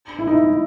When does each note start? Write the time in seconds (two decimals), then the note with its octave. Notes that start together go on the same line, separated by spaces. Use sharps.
0.19 E4
0.27 D#4
0.44 E4